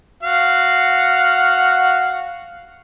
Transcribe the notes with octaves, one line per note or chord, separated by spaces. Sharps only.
F#4 F5 F#5